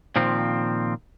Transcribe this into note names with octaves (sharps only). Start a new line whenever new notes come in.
A#2 D#3 F3 C4